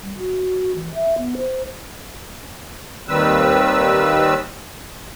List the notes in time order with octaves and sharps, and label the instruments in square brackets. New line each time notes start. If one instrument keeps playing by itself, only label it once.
[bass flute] G3
F#4
E3
E5
B3
C5
[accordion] D#2 D#3 G3 C4 B4 E6